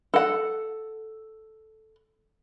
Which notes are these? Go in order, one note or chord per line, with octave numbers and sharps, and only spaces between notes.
A4 F#5